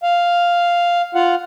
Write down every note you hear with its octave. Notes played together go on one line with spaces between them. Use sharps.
F5
F4 F5 F#5